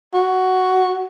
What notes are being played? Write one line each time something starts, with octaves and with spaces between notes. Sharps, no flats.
F#4